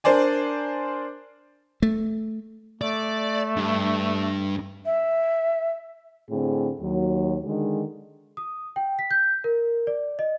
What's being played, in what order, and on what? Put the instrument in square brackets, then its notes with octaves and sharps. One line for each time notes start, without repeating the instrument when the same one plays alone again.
[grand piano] D4 A#4 C5 D5 G#5
[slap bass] A3
[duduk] A3 [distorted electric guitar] D5
[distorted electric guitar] G2
[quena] E5
[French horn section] A2 D3 C4 G#4
D#2 F#3
D3 D#3 G#3
[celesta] D#6
G5
B6
G6
A#4
D5
D#5